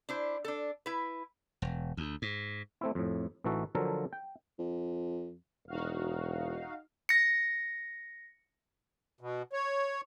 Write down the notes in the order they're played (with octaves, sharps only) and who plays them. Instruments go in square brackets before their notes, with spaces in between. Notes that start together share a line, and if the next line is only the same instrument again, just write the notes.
[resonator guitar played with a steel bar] D4 E4 C5
D4 A4
E4 B4
[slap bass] E1
D2
G#2
[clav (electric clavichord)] A3 C4 E4
F2 A2
A1 E3 D#4 F#4 A4
D3 F3 F#3 F4 A4 A#4
G5
[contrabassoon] F2
[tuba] E1 [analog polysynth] D#4 F#4 F5
[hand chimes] A#6 C#7
[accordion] B2
C#5